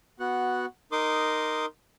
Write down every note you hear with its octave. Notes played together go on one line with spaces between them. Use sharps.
B3 F#4 F#5
D#4 A#4 C6 D6 D#6